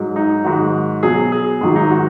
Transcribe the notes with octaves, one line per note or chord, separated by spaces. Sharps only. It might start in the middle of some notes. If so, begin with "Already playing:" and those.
Already playing: G#2 F#3
D#4
G#2 D#3 F#3 F#4
B2 F#3 G#4
G#4
G#2 D#3 F#3
D#4
F#4